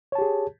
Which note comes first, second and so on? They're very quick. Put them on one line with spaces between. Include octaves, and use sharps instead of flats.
C#5 A5 G4 G#4